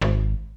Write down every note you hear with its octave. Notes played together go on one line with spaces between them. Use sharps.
G#1